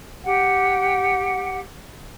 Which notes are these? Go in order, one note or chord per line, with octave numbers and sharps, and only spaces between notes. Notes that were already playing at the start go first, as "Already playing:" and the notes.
G4 F#5 G5